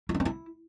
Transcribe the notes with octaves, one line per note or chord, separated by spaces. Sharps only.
E4
D4
C#4
E4